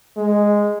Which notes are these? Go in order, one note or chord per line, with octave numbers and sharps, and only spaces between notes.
G#3